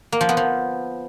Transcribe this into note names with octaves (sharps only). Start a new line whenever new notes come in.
A#3
F3
B3
F3